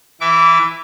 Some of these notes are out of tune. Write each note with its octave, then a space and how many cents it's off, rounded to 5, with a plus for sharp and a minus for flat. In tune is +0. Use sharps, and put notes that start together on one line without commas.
E3 +0 E5 +20 D6 -25